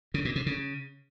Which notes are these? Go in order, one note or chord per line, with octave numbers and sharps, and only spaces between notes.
C#3
A#2
C3
C#3